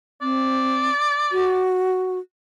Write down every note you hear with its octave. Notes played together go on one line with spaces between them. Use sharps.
C4 D5
F#4